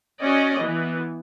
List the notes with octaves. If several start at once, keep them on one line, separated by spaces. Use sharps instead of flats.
C#4 F#4 D5 D#5
E3 B3